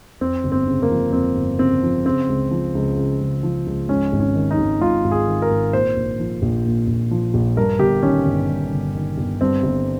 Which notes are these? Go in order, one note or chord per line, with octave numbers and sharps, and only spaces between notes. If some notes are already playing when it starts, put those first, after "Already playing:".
F2 C4
G1
C4
C#3
A#3
F3
F2 C4
G1
C#3 C4
F3
C#3 C4
C#2
F3
C#2
C#3
C#2
F3
C#2
G#2 C#4
G#1
C#4
D#3
D#4
G#1
G#2 F4
G#1
G#4
D#3
A#4
G#1
A#2 C5
A#1
F3
A#1
A#2
A#1
F3
A#1
G2 A#4
G1 G4
D#3 C#4
G1
G2
G1
D#3
G1
G2 C4
G1